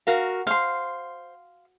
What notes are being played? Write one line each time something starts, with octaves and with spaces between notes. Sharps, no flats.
F#4 A#4 F5
C5 F5 C6